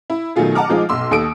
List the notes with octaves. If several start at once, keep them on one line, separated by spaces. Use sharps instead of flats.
E4
B2 D#3 F#3 A3 F4 G#4
D#5 F#5 A5 A#5 D6 F6
F3 G#3 D#4 F4
B1 C6 E6
D#2 A4 D#6 D7